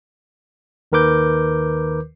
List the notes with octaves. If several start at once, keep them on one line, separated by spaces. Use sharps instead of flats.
D#2 D#3 A#4 B4 D6 G6